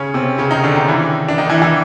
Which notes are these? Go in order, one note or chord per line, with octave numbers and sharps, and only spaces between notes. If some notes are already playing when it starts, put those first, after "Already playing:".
Already playing: C#3 C#4
C3 C4
C#3 C#4
D#3 D#4
D3 D4
D#3 D#4
E3 E4
D4
D#3 D#4
E3 E4
E3 E4